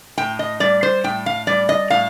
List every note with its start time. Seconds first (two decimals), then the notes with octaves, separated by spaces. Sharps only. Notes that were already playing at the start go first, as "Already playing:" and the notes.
0.17 A2 G5
0.39 D#5
0.60 G3 D5
0.83 C5
1.04 A2 G5
1.26 F5
1.47 G3 D5
1.69 D#5
1.90 A2 F5